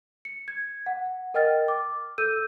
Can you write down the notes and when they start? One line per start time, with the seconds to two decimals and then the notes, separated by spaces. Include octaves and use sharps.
0.25 C#7
0.48 G#6
0.86 F#5
1.34 A#4 D#5 G5 F6 A6
1.68 D6
2.18 A4 E6 G6 D#7